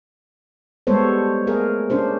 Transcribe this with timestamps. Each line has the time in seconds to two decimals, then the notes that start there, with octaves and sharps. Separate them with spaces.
0.87 G3 G#3 B3 A4 C5 C#5
1.47 A3 G#4 A#4
1.90 C#4 D4 G#4 C5